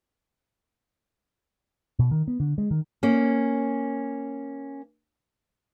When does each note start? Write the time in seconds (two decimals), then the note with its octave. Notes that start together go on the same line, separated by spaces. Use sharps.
1.99 B2
2.11 D#3
2.28 B3
2.40 D3
2.58 G#3
2.71 D#3
3.03 A#3 C#4